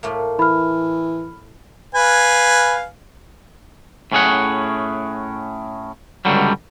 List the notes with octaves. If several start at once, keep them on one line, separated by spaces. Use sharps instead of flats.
A2 A3 A#3
E3 B5 F6
B4 F5 G#5
A2 C#4 G#4 F#5
C#2 G2 D3 F#3 G3